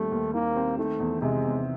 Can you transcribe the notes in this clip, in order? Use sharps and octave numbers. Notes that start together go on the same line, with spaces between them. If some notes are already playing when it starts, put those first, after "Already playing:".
Already playing: D#2 D#3 G3 A3 C4
D#2
D#3 A#3
C4
D#3 A3
E2
C3 G#3
E2